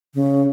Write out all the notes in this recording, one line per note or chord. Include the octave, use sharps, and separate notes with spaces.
C#3